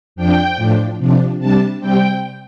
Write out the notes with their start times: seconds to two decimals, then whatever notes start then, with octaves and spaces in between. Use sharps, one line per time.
0.16 F2 F3 D4 G5
0.57 A2 F3 D4
0.98 C3 F3 D4
1.39 C3 G3 D4 A5
1.80 C3 G3 C4 G5